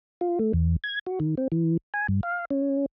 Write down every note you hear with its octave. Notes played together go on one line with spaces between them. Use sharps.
F4
A3
E2
G#6
F#4
D#3
C4
E3
G#5
G2
F5
C#4